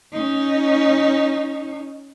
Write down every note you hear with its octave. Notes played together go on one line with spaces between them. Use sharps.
C#4 D#4